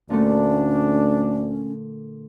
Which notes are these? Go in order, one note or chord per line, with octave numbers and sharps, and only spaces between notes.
D2 A#2 D3 A3 C#4 D4